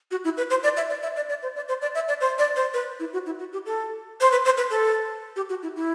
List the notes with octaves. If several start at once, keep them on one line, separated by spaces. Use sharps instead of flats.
F#4
E4
B4
C5
D5
E5
D5
E5
D5
D5
C5
D5
C5
D5
E5
D5
C5
D5
C5
B4
E4
F#4
E4
F#4
G4
A4
C5
B4
C5
B4
A4
G4
F#4
E4
E4